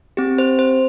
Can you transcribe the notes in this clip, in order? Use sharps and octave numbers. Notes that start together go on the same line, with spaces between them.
C4 G4
C5
C5